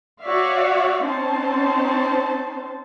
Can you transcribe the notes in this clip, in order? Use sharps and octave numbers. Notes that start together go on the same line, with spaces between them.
F#4 C#5 D5 E5 F5
C4 C#4 D#4 C5 A5